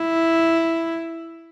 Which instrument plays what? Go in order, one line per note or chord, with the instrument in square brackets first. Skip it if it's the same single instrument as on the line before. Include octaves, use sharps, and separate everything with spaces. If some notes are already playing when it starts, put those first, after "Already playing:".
Already playing: [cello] E4